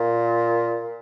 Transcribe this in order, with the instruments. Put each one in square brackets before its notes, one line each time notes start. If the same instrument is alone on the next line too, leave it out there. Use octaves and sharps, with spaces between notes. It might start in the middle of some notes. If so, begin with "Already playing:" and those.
Already playing: [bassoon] A#2